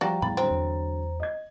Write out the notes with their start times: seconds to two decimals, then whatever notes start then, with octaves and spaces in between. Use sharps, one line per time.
0.01 F3 G3 F#4 D5 F5 G5 A#5
0.22 E2 A2 G3 B5 A6
0.37 D3 F#3 C4 C5 A#5
0.51 E2
1.20 D#5 G#6